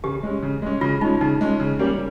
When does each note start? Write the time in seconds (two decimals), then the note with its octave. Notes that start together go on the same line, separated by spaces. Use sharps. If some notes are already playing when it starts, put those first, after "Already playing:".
0.04 C#3 G4
0.23 G#3 C#4
0.43 C#3
0.62 G#3 C#4
0.81 C#3 F4
1.01 G#3 C#4 D#4
1.21 C#3 D#4
1.41 G#3 C#4
1.60 C#3
1.79 G3 A#3 C#4 G4